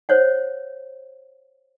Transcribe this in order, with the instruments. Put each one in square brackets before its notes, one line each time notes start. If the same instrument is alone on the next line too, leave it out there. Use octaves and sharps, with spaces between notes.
[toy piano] C5 C#5 F#5